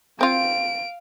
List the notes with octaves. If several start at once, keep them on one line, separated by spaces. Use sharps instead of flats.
C4 F4 F5 D7